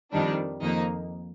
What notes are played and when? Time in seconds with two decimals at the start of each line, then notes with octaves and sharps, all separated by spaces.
0.11 F2 D#3 G3 D4
0.61 F2 D#3 A#3 D#4